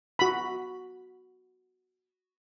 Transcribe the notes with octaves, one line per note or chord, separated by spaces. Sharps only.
F#4 B5